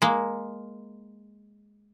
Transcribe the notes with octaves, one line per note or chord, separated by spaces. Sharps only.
G#3 A#3